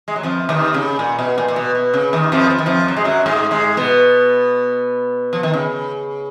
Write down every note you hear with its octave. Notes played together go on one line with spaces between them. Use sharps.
G#3
F#3
F2 F3
D#2 D#3
C#3
A#2
B2
A#2
A#2
B2
B2
C#3
D#2 D#3
F2 F3
F3
D#3
F2 F3
F#3
G#3
F#2 F#3
G#2 G#3
G#2 G#3
B2 B3
F3
D#3
C#3